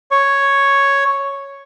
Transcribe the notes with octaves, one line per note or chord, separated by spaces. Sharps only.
C#5 C#6